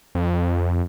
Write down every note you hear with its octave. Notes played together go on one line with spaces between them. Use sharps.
F2